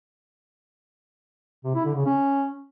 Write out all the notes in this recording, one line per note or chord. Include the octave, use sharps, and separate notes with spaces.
C3
E4
D3
C#3
C#4